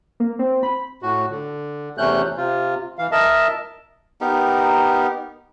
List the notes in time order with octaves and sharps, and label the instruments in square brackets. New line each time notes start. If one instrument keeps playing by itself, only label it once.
[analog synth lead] A#3
C4
B5
[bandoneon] A2 F#4
D3
E2 C3 A3 C#4 F#6 G6
C3 F4
E3 F5
A#4 D#5 E5 A5
[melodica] B3 D#4 G4 A#4